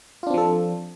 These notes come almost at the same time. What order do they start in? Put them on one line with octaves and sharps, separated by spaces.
F4 D4 C4 F3 A4